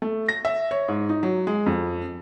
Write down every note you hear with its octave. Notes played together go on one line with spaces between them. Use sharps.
A3
A#6
E5
C#5
G#2
D#4
F#3
G#3
F2